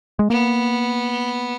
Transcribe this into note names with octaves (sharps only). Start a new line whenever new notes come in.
G#3
A#3 B3